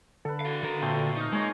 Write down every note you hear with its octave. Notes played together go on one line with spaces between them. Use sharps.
D3 A4 B4
F#4 F5
D#3 A#4
A#2 F3 A3 C4
D#4 D#5 F5
G#3 A#3 G#4 C#5 C6